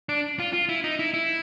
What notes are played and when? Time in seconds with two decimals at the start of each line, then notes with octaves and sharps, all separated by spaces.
0.09 D4
0.40 F4
0.53 F4
0.69 E4
0.84 D#4
0.99 E4
1.14 E4